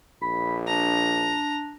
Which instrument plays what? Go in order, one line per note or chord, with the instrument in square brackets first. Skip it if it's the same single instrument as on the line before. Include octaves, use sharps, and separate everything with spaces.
[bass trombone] A#1 [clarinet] B5
[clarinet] D4 [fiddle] A#5